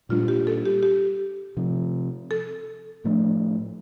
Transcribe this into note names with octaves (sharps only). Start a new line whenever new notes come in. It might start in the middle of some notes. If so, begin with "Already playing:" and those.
A#2 G3 D4 F4
G4
A4
G4
G4
C3 F3 C4
A4
A2 F3 A3 D4